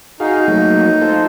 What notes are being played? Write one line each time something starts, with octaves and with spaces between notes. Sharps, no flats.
D#4 F#4 G#4 F5
F#3 A3 A#3
F4 A4 C5